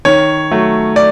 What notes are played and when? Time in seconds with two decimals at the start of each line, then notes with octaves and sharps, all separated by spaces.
0.05 D#3 C#5
0.51 F#3 A3
0.96 D5